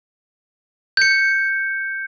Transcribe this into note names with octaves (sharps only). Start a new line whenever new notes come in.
G6 C#7